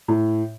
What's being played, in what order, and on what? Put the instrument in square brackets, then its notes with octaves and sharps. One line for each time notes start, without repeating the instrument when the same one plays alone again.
[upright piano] A2